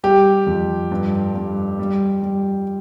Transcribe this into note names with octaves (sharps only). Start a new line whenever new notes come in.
G3 G4
F2
G2
G2
G3
G3